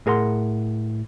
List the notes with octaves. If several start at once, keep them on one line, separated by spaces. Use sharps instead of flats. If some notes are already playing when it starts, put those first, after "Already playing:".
A2 G#4 A#4 F#5 C6